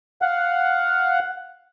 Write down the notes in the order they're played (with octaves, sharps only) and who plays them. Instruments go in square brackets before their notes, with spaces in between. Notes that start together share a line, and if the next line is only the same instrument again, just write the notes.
[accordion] F5 F#5